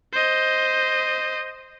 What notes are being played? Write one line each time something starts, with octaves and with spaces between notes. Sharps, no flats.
C5 D#5